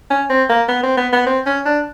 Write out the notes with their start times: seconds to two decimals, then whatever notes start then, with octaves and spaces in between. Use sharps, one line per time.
0.11 C#4
0.29 C4
0.49 A#3
0.68 B3
0.83 C4
0.97 B3
1.13 B3
1.26 C4
1.46 C#4
1.65 D4